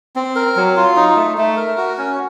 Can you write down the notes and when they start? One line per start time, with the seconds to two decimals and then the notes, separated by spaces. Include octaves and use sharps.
0.16 C4
0.35 A#4
0.56 F#3
0.77 F4
0.96 D#4
1.16 A3
1.38 A3
1.57 A#4
1.77 F#4
1.98 C#4